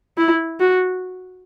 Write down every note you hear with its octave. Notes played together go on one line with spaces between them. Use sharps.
E4
F#4